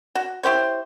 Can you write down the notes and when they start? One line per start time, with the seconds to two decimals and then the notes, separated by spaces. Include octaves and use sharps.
0.15 F#4
0.43 E4 G4 C5 C#5